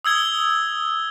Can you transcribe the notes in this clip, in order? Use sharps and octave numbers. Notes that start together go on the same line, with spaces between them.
D#6 E6 G#6 G7